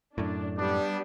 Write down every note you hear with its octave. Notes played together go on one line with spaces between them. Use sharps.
F#2 A2 D4
G3 B3 D4